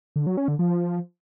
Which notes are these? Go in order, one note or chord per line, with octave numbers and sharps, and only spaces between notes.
D3
F#3
C#4
D3
F3